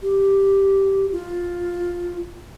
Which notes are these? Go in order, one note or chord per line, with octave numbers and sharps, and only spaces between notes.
G4
F4